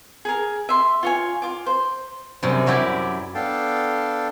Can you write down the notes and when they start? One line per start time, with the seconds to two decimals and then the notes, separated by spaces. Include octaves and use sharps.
0.25 G#4 A#4
0.69 E5 C6
1.03 F4 C#5 G#5
1.42 F4 D6
1.66 C5
2.43 F#2 C3 G3
2.66 F#2 F#3 E4 G4 D5
3.35 B3 D4 A4 F5 G5 A5